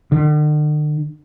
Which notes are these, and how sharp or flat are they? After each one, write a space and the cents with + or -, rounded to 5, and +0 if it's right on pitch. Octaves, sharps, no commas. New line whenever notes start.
D3 +45